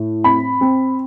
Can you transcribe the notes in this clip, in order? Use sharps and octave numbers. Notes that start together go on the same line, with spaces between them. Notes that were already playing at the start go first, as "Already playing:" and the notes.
Already playing: A2
C4 B5
C4